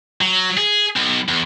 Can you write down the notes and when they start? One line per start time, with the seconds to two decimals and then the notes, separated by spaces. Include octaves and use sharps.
0.21 F#3
0.57 G#4
0.96 B1
1.28 E2